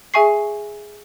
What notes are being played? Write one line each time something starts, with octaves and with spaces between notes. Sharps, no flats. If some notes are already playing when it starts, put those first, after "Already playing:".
G#4 E5 G#5 C#6 C7